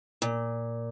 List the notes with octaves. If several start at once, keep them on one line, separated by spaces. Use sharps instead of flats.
A#2